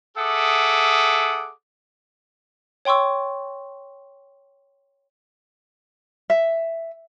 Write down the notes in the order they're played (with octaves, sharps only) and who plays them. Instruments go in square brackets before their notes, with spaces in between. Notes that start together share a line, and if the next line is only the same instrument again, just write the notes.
[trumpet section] G#4 A4 E5 F#5 D6 D#6
[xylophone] C#5 G5 C6 C#6 E6
[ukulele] E5